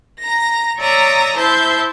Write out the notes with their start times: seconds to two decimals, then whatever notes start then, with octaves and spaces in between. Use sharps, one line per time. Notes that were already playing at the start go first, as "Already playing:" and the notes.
0.20 A#5 A#6
0.77 C#5 D5 E5 A#5 D#6
1.36 E4 C5 E5 A5 G6